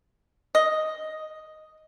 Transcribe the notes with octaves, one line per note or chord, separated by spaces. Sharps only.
D#5